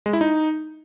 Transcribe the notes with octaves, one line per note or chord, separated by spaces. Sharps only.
G#3
E4
D#4